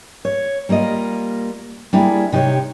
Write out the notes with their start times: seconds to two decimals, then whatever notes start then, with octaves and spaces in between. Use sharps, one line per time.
0.25 C#5
0.69 G3 A#3 F4 D#5
1.93 G3 A#3 D4 E4 G#4
2.32 C3 D#4 G4 C#5